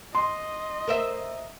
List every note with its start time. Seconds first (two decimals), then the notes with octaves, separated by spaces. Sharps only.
0.15 D#5 C6
0.87 A#4 C5 E5